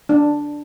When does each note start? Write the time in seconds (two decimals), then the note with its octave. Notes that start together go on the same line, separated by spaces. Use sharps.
0.09 D4